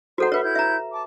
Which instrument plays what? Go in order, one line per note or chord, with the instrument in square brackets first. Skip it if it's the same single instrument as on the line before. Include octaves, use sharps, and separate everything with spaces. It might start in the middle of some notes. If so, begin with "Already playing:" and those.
[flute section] D#4 C5 [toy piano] F#4 A4 F#5
[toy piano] B4 C#5 [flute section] E5 F#5 B5
[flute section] E4 G6 G#6
[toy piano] E5 A#5
[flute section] A5 D6